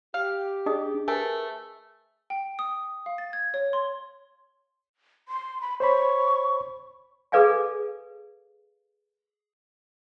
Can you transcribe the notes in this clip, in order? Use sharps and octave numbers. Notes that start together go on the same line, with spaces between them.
G4 F5
D4 G#4 D#5 D#6
A3 A#4 B4 G#5
G5
D#6
F5
A6
G#6
C#5
C6
C6
B5
C5 C#5 B5 C#6
G#4 A4 B4 D5 F5 G#5